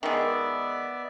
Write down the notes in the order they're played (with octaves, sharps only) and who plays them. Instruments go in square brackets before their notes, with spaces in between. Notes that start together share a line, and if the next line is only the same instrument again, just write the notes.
[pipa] D#3 G#3 [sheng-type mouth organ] B3 D5 E5